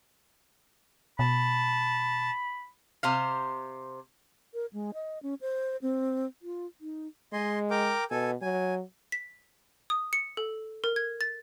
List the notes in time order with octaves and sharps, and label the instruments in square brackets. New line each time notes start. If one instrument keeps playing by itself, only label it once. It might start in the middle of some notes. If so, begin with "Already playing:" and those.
[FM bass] B2 [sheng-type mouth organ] A5 [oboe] B5
[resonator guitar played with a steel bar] C3 C5 F5
[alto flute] A#4
G#3
D#5
C#4
C5
C4
F4
D#4
[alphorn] G#3 [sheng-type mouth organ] D#5 G#5 C6
[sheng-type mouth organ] A#4 G5 D6
[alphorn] B2 [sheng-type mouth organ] A4 G#5
[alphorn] F#3 [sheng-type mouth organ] G#5
[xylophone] B6
D#6
C#7
A4
A#4
G#6
A6